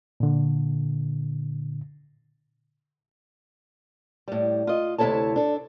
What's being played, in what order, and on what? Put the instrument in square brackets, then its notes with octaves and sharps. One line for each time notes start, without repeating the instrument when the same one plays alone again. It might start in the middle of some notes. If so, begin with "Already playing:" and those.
[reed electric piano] A#2 D3
[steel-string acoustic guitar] A2 G3
F4 D#5
D2 C3 E4 A4 C#5 A5
D4 A4